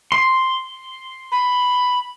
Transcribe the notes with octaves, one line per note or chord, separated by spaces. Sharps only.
C6
B5